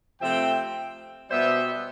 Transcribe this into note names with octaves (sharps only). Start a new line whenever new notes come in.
C3 F3 A3 C4 E5 G5
B2 G3 B3 C5 E5